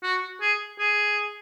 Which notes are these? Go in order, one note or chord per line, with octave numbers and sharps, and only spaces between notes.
F#4
G#4
G#4